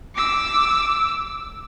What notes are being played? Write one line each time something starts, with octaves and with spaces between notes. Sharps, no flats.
D6 E6